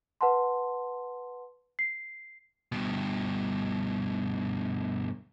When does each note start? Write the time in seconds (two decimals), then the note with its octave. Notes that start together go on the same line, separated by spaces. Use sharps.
0.21 B4 F#5 A5 C6
1.79 C7
2.72 G2 B2